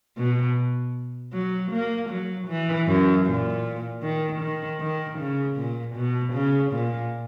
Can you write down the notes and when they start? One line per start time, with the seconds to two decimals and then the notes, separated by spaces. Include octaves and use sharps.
0.17 B2
1.32 F#3
1.71 A#3
2.10 F#3
2.48 E3
2.87 F#2
3.26 A#2
4.02 D#3
4.40 D#3
4.80 D#3
5.18 C#3
5.57 A#2
5.95 B2
6.33 C#3
6.72 A#2